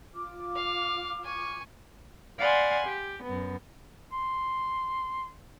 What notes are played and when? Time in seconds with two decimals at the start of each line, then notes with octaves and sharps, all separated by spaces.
0.14 F4 D6 F6
0.55 F5
1.24 G#5 C#6
2.38 D5 F5 F#5 G#5 B5 C6
2.87 G4
3.24 F#2 B3
4.12 C6